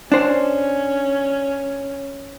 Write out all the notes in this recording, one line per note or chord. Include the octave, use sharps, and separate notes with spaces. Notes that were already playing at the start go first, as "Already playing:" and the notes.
C#4 D4 C5